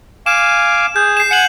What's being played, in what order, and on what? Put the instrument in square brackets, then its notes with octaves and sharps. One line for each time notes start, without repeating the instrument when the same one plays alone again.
[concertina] F5 G#5 D6 [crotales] E7
[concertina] G#4 [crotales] G6
[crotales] C7 E7
[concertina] F#5 G#5 [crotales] C#7 F#7